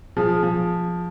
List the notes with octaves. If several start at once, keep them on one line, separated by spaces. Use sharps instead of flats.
F3 G#4
F3